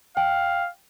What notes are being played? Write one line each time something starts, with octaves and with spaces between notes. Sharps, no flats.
F5 G5